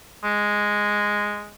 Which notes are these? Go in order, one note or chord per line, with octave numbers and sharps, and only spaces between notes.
G#3